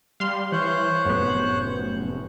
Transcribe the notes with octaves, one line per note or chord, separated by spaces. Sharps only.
G3 F5 C6 F6
E3 C5 C#5 F#6
F1 F#2 A2 B3